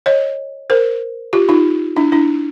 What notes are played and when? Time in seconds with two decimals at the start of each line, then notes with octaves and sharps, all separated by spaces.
0.06 C#5 D#5
0.70 A#4 C5
1.33 F4 G4
1.49 D#4 F4
1.96 D4 E4
2.12 D4 E4